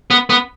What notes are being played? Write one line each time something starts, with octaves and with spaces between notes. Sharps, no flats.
B3
B3